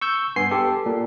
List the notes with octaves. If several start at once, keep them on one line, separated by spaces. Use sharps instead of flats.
C#6 E6 G6
G2 B3 G#5 C6 C7
G4 A4
A#2